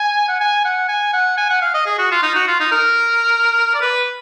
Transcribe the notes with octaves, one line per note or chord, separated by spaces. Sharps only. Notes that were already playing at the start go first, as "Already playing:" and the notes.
Already playing: G#5
F#5
G#5
F#5
G#5
F#5
G#5
F#5
F5
D#5
G#4
F#4
F4
D#4
F#4
F4
D#4
A#4
D5
B4